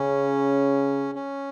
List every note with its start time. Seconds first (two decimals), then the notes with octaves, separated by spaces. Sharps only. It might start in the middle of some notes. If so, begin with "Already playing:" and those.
Already playing: C#3 C#4
1.15 C#4